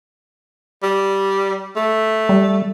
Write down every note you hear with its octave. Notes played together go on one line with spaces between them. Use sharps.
G3
A3
G3